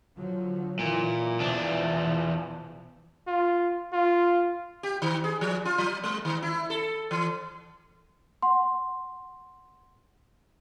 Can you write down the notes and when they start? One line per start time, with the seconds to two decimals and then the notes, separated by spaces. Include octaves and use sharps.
0.18 D3 F3 F#3
0.79 A#2 E3 F#3
1.39 E2 B2 E3 F3 D4
3.27 F4
3.93 F4
4.83 G4
5.02 D#3
5.24 G#4
5.41 F3
5.65 F4
5.78 F#3
6.04 G#3
6.25 D#3
6.43 E4
6.70 A4
7.11 E3
8.42 F#5 C6